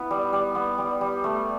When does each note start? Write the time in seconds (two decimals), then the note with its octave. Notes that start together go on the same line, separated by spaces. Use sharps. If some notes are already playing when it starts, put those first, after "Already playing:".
Already playing: B3 E4
0.10 G3
0.33 G3
0.55 B3
0.78 G3
1.01 G3
1.24 A3